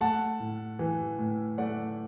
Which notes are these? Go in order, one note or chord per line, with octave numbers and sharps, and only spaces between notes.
A3 F#5 A5
A2
E3
A2
A3 D5 F#5